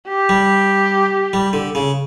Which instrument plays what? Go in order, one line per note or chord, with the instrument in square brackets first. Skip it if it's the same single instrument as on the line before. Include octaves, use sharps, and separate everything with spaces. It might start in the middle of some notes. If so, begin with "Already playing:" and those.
[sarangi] G4
[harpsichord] G3
G3
D3
C#3